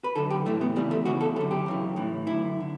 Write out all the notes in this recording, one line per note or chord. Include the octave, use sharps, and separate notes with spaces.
B4
F#2 D3 A4
G4
A2 E3 A3
B3
E2 C#3 E3 G3
A3
E2 C#3 E3 F#4
A4
F#2 D3 A4
G4
F#2 C#3 E3
A2 E3
F#2 D3 E4
D3